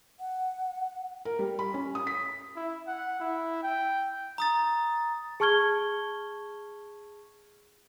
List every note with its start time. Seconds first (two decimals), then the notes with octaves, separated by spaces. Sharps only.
0.19 F#5
1.25 A#4
1.39 G3
1.59 B5
1.74 C#4
1.95 D#6
2.07 B6
2.56 E4
2.88 F#5
3.20 E4
3.63 G5
4.38 A#5 D#6 A6
5.40 G#4 A5 C#6 F6 G#6 G7